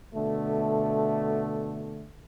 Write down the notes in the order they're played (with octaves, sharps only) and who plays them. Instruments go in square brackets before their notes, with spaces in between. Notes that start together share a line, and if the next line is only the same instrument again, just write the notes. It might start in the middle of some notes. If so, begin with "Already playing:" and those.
[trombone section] B2 D3 A3